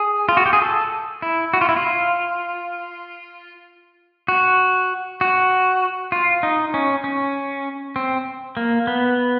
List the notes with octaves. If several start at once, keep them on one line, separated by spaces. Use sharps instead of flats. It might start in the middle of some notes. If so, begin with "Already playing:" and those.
Already playing: G#4
F4
F#4
G4
G#4
A4
E4
F#4
F4
E4
F4
F#4
F#4
F4
D#4
C#4
C#4
C4
A#3
B3